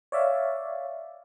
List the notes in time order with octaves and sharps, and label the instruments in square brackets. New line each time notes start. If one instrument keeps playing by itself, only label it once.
[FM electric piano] C#5 D5 E5 F5